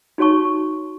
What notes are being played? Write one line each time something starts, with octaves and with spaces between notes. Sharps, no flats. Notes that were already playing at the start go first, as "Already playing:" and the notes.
D#4 F#4 C#5 A5 C#6